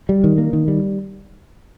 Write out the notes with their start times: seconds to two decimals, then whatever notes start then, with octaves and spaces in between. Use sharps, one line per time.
0.09 G3
0.24 D#3
0.38 A#3
0.53 D#3
0.68 G3